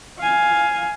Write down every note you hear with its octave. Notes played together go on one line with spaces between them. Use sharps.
F5 G#5